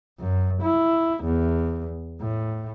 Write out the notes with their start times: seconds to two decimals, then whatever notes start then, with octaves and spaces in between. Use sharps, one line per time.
0.20 F#2
0.62 E4
1.24 E2
2.21 A2